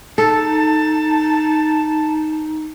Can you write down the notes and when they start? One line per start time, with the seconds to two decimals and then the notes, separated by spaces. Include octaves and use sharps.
0.18 D#4 A4 A5